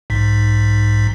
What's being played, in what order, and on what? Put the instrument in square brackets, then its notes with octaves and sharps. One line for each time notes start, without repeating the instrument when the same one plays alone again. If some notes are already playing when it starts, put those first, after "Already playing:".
[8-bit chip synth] B1 G#2 B6